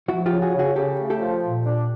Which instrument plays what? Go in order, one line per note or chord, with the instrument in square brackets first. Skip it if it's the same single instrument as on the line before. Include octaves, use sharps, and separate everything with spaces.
[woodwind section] F3 [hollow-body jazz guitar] E4 F#4
[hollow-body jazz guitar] F4 G4
[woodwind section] C#3
[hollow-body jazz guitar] F#4 G#4
[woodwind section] C#3
[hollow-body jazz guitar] F#4 G#4
[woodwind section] C#3 [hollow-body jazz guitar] G4 A4
[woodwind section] A3
[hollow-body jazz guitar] G4 A4
[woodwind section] F3
A#2
D4